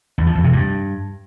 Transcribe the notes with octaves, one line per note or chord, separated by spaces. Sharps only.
E2
F3
F2
C3
G2